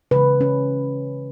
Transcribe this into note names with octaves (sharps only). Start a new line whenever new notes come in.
C#3 E3 G#3 B4
C#4